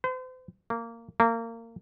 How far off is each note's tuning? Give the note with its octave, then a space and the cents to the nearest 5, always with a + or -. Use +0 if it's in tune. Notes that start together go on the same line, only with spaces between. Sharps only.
C5 -40
A#3 -15
A#3 -25